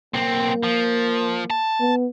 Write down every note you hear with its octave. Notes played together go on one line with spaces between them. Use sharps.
B1 A#3 C4
F3
A5
B3